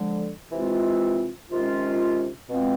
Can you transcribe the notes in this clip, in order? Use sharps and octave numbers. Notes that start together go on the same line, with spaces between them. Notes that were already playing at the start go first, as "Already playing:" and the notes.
Already playing: D3 F3 G#3
C3 E3 G#3 C4 F4
C3 D#3 G#3 C#4 F4
B2 G#3 C4 F4